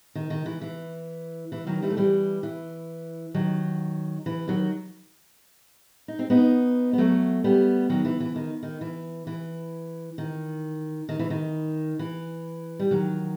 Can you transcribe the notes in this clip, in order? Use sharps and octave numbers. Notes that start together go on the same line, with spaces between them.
D#3
D#3
E3
E3
E3
D#3 F#3
E3 G3
A3
E3 G3
E3
D#3 F#3
E3
D#3 F#3
D#4
C4
B3 D#4
B3
F#3 A3
G3 B3
D#3 F#3
E3
E3
D#3
D#3
E3
E3
D#3
D#3
E3
D#3
E3
G3
D#3 F#3